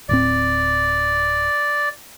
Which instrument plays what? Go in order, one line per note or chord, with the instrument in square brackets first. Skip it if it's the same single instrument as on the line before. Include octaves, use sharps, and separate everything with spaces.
[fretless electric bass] D1 A2 C4 [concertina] D5